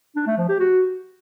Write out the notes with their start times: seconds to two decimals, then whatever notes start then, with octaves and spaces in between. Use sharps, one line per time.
0.16 D4
0.27 A3
0.38 F3
0.49 G4
0.59 F#4